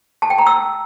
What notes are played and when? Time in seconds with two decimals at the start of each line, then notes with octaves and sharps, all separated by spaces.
0.22 A5
0.30 G5
0.38 A#5
0.47 E6